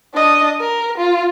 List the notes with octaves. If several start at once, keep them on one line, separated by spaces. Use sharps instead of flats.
D4 D#5
A#4
F4